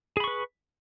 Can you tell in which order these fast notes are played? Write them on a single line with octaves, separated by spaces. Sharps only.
G#4 B5 C#6 B4